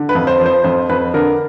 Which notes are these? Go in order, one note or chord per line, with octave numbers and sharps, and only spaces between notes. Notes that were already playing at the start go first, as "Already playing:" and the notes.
Already playing: D3
B4
F2
C5
F3
C5
F2 C5
F2 B4
D3 A#4